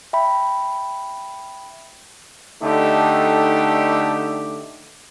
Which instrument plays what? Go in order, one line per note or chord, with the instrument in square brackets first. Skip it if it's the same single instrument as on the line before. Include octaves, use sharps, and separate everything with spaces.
[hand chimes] E5 G5 B5
[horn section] D3 A3 D#4 G4